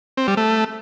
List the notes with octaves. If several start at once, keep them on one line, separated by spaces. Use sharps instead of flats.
C4
G3
A3